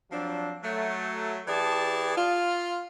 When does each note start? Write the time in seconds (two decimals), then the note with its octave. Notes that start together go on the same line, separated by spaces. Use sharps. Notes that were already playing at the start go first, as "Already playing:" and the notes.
0.11 F3 F#3 C4 D4
0.63 F#3 A3
1.47 E3 G4 G#4 D5 A5
2.16 F4